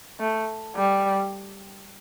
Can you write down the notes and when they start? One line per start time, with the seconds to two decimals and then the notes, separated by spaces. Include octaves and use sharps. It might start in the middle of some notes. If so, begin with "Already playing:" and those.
0.20 A3
0.76 G3